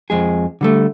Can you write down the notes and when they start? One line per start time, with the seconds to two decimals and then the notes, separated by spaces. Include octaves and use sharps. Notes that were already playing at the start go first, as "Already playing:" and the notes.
0.10 F2 G#3 G#4
0.61 D3 G3 A3